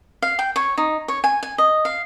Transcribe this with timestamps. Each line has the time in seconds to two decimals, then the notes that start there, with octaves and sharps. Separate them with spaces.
0.22 F5
0.39 G5
0.56 C#5
0.78 D#4
1.08 C#5
1.24 G#5
1.43 G#5
1.58 D#5
1.85 F5